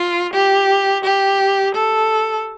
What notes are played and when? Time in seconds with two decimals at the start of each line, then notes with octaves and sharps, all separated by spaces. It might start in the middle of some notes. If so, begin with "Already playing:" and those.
Already playing: F4
0.34 G4
1.04 G4
1.75 A4